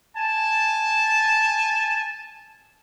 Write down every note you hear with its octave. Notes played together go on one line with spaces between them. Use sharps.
G#5 A5